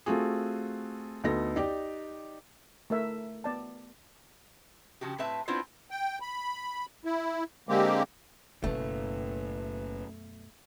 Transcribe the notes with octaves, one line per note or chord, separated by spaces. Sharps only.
A3 C4 F4 F#4 G#4
D2 B3 D#4 A4 A#6
D#4 G4 D5
A3 A#4 E5
B3 D5 A5
C#3 F3 F#4 G4
A2 C4 B4 E5 A5
B3 C4 D4 E4 F4 C5
G5
B5
E4
D3 G#3 A#3 C4 G4
F#1 F#2 B2 A3 B4